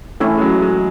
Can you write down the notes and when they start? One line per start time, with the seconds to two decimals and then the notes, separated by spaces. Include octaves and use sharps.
0.20 E3 A3 C#4 E4 A4
0.37 G#3
0.41 F#3
0.62 G#3